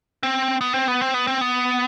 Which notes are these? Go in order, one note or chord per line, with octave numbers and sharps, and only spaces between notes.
C4
B3
C4
B3
C4
B3
C4
B3